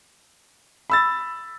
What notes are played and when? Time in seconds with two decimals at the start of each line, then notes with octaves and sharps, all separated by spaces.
0.90 B5 E6 A6